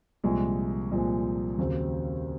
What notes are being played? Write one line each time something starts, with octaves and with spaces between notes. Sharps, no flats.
C2 A#2 F3 G#3
C2 A#2 F3 G#3
D#2 C#3 F#3 C4